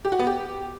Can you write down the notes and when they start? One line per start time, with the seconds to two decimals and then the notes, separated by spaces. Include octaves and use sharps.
0.05 G4
0.12 F#4
0.19 B3
0.27 G4